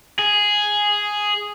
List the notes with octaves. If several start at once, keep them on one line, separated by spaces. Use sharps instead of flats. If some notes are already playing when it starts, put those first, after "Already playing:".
G#4